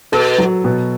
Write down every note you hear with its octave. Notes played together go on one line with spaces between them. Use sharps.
B2 A4
F#3
B2